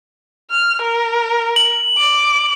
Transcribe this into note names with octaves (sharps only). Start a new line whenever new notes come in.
F6
A#4
F#7
D6